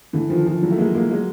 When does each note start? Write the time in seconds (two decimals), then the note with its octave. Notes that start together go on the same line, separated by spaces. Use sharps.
0.13 D3 E3
0.30 D#3 F3
0.46 D#3 F3
0.62 E3 F#3
0.71 A3
0.78 G#3 A#3
0.95 G#3 A#3
1.11 F#3 G#3